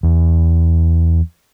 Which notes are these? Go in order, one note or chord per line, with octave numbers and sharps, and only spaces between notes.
E2